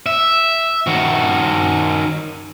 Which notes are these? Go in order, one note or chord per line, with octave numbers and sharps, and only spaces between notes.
E5
D#3 F#4